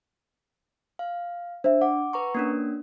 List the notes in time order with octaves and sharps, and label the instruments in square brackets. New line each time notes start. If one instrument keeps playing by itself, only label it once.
[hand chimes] F5
[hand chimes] D4 [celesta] C5 E5
[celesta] F#5 [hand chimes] D6
[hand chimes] B4 A#5 C#6
A#3 C#4 D4